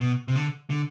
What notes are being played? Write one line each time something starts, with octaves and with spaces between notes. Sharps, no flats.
B2
C3
D3
D3